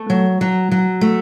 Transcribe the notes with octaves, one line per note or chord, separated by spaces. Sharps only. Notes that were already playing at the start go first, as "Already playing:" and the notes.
Already playing: A3
F#3
F#3
F#3
A3